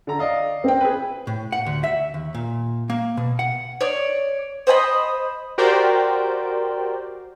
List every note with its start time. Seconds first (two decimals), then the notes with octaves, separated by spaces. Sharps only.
0.07 D3 A#5
0.19 D5 D#5 F5
0.64 C4 G5
0.81 G#4 B4
1.27 A2
1.52 F#5
1.66 D2
1.84 E5
2.14 D#2
2.35 A#2
2.90 A#3
3.17 B2
3.39 F#5
3.81 C#5 D5
4.67 C5 D#5 G#5 B5
5.58 F#4 G4 A#4 C5 D5 G5